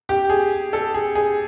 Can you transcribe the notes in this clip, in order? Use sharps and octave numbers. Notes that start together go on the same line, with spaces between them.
G4
G#4
A4
G#4
G#4